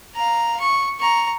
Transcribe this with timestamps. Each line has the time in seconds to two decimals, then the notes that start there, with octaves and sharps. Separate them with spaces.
0.15 F5 A#5
0.60 C#6
1.00 A#5 C#6